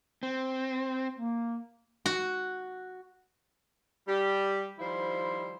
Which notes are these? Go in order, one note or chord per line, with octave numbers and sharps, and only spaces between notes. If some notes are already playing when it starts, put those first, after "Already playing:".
C4
A#3
F#4
G3 G4
D#3 F3 G3 E4 C5